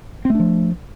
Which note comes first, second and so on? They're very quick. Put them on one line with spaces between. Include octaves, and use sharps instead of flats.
C4 A3 D4 F3